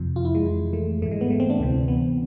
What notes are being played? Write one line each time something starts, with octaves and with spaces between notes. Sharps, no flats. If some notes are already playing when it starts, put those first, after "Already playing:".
Already playing: F2 C3 F3
F4
E4
G#3
F2 E3
A3
G#2 E3 A3
G#3
B3
A3
C4
D4
D2 C3 E3 C4
B3